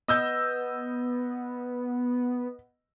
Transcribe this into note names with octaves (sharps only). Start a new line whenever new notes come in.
B3 D#5 E6 G6